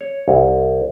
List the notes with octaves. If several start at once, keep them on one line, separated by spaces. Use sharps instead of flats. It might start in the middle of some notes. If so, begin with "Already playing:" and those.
C#5
C2